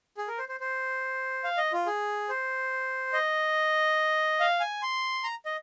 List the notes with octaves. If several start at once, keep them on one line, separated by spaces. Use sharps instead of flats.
G#4
A#4
C5
C5
C5
F5
D#5
F4
G#4
C5
D#5
F5
G#5
C6
A#5
D#5